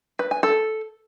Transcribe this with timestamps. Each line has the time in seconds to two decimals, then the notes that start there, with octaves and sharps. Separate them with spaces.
0.19 B4
0.31 G#5
0.43 A4